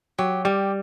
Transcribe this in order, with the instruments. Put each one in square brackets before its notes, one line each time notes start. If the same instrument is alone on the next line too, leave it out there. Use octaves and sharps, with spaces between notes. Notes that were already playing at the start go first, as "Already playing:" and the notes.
[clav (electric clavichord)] F#3 [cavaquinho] G4
[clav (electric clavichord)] G3 [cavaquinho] G4